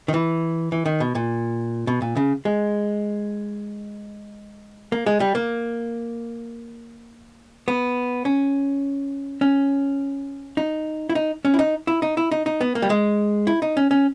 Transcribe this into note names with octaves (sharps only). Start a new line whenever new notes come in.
D#3
E3
E3
D#3
B2
A#2
B2
A#2
C#3
G#3
A#3
G#3
G3
A#3
B3
C#4
C#4
D#4
E4
D#4
C#4
E4
D#4
E4
D#4
E4
D#4
D#4
B3
A#3
G3
G#3
E4
D#4
C#4
C#4